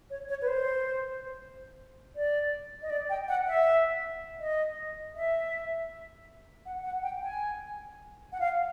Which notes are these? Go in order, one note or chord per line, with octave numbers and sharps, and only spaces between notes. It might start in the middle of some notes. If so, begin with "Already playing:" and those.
C#5
C#5
B4
C5
D5
D#5
D5
G5
F#5
E5
D#5
E5
F#5
F#5
G5
G#5
F#5
F5